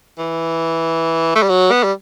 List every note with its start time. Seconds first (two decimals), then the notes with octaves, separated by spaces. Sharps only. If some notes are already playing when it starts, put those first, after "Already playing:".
0.18 E3
1.36 A3
1.42 G3
1.49 F#3
1.71 B3
1.84 G3